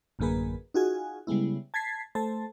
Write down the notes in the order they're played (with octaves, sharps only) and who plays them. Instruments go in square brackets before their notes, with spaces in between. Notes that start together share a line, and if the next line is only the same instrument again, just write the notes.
[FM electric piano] A1 F#2 D3 A#3 G#4 B4
D#4 F4 F#4 G#4 G#5
C#3 G3 G#3 B3 E4
A5 G#6 A6 B6 C7
A3 A4 C5 A5